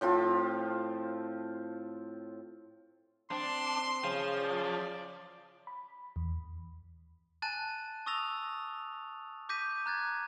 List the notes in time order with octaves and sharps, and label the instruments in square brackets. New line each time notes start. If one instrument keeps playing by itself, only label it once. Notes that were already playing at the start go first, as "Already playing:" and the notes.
[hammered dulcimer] A2 F3 C4 F4
[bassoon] C4 [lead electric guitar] D4 [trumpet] C6
[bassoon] C#3 [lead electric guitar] F3
[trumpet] D5
[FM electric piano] B5
E2
[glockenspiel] G#5 A5 F#6 A6 D#7
C#6 D#6 E6 A6 A#6 F7
D6 G6 A#6 B6 D#7
A#5 F#6 G#6 A6